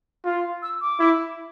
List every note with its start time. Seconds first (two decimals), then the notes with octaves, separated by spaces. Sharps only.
0.25 F4
0.62 E6
0.81 D6
1.00 E4